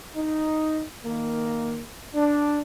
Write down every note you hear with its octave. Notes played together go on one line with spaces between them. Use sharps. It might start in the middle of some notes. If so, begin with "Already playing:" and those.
D#4
D#3 A#3
D4